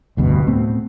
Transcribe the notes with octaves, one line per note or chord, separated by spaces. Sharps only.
F1 D2 G2 B2
A2 A3 B3 C4